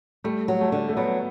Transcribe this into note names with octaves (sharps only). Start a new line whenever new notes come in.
G3 A3
F#3
A3
D3
A3
F#3 B3